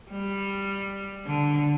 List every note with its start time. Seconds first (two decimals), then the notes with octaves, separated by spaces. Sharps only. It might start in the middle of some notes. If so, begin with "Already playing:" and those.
0.11 G3
1.26 D3